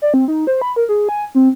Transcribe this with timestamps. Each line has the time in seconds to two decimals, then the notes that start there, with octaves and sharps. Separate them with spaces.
0.02 D5
0.14 C4
0.28 D#4
0.47 C5
0.62 B5
0.76 A#4
0.89 G#4
1.09 G#5
1.35 C4